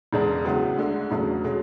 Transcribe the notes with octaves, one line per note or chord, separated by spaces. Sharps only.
E1 E2 C#3 G#3 D4
C#2 C#3 F#3 B3 E4
D2 D3 G#3
E1 E2 C#3 F#3 A3
B2 G#3 C#4